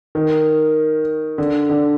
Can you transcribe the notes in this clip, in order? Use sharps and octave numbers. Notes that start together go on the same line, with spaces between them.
D#3
D3
D3